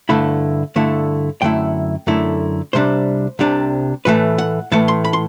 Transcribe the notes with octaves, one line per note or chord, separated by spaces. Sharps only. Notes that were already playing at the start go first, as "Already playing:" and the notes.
G2 D3 A3 E4 B5
G2 D3 A3 E4
F#2 D3 A3 E4 G5
F#2 D3 A3 E4
C2 C3 G3 D4 C5
C2 C3 G3 D4
A2 E3 A3 B4
F#5
A2 E3 A3 A5
C6
B5
C6